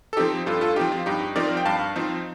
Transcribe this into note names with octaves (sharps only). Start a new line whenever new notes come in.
A4
F3 C4 D#4 G4
G2 F4 A4
F4 A4
F3 C4 D#4 G4
F4
G2 D#4 G4
F3 C4 D#4 A#4 D5
G5
G2 F5 A5
F3 C4 D#4